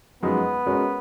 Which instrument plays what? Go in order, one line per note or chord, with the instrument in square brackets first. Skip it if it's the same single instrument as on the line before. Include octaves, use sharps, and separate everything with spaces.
[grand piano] F#2 F3 G#3 D#4 [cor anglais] B3
[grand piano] G#3 C#4 F#4 A#4 C#5